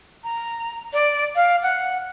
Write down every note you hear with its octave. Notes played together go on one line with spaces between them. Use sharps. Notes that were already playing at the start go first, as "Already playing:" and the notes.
A#5
D5
F5
F#5